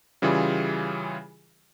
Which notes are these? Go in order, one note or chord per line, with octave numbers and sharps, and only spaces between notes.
C#3 E3 G3 F4 G#4